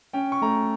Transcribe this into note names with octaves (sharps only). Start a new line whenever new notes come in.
C#4 G5
C#6
A3 A#5